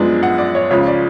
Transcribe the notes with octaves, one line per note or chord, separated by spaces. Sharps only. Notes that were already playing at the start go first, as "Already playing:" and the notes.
Already playing: F#2 F3 G#3 B3 D4
F#5
D5
C#5
C#2 C#3 F3 C#5
D5